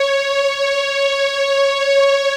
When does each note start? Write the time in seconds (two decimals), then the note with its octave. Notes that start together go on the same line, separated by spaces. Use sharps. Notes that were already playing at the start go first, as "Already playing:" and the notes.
Already playing: C#5
0.54 C#5